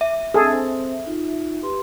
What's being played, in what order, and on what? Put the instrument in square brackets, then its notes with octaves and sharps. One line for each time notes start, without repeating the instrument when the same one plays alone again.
[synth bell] E5
[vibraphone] C4 D4 [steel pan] G#4 A4
[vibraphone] C4 C5
D#4 F4
G4 B4 C6